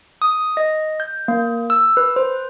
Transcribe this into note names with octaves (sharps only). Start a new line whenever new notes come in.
D#6
D#5
G6
A#3
E6
B4
C5